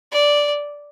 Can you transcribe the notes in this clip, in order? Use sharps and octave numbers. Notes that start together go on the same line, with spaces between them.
D5